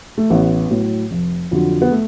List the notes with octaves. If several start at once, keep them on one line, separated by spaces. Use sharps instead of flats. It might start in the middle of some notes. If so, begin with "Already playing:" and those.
A3
A1 B3
A2 F#3
F1
F2 D3 F#3
B3
A3